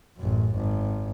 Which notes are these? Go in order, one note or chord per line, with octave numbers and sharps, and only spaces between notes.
A1 F#2
G#1